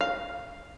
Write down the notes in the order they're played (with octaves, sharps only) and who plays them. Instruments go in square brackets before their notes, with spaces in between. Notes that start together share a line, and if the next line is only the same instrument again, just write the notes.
[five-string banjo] F5